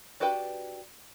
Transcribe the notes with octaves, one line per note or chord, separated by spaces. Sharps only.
D4 F#4 G4 B4 G5